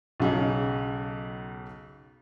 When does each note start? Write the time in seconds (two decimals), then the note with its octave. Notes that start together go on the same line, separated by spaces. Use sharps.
0.20 B1 C#3 D#4